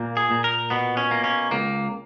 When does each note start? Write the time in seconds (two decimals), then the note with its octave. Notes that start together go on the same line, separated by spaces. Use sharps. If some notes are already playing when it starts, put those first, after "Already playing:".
Already playing: A#2 A#3
0.17 G#4
0.31 A#2
0.44 A#4
0.70 B2 B3
0.97 C#4
1.11 A#3
1.24 C#4
1.51 C#2 A#3